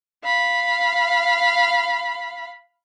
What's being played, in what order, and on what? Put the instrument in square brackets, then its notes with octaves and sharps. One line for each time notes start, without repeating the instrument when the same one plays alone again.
[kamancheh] F5 B5